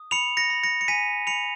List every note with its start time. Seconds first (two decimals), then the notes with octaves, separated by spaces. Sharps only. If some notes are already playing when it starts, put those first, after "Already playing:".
Already playing: D#6
0.11 B5 C#7 F7
0.37 A#6 C#7
0.50 B5
0.63 A#6 C#7
0.81 C#7
0.88 G#5 B6 D#7
1.27 B5 C#7 F7